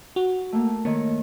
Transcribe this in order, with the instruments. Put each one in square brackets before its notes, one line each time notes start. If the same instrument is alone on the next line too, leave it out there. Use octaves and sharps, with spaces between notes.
[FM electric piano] F#4
[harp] A3 A#3
[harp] D#3 C#5 [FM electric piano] A#3